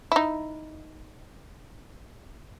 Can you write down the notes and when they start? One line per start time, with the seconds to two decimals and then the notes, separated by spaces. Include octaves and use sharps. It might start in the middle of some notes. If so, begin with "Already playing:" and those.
0.12 D#4 E4